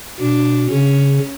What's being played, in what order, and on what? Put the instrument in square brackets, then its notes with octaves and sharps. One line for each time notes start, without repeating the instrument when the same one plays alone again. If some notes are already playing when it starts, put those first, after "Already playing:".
[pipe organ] B2 [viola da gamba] D4
[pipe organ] C#3 [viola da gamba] C#4